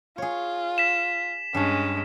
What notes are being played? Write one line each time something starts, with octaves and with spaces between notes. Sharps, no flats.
F4 G#4 C#5
B6 E7
G2 G#3 C#4 A5